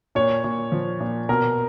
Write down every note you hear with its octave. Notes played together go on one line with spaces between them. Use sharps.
A#2 C#5
A#2
F3
A#2
B2 A#4